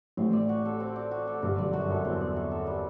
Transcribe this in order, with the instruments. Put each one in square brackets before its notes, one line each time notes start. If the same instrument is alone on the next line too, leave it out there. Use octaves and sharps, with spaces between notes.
[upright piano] A1 A2 [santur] C4
[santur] D5
F#4
A4
C4
D5
F#4
A4
[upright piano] G1 G2 [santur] C4
[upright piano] G1 G2 [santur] D5
[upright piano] F#2 [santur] F#4
[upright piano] F#2 [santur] A4
[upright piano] E2 [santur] C4
[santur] D5
F#4
A4
G3